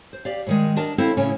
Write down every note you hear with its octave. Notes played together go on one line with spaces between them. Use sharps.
C5
G4 D5 F5
A2 D#3 G#3
D4 A#4 D#5 A5
C4 E4 A4 C5 F5
A2 C#3 C#4